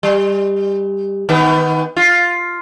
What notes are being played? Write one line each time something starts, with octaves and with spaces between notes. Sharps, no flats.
G3
D#3 B3
F4